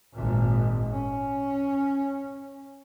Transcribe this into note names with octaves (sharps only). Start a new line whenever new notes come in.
G#1 A#2
C#4